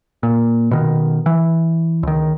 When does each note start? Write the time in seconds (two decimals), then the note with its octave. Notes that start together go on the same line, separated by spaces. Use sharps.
0.23 A#2
0.71 B2 D#3
1.26 E3
2.03 C#2 D#3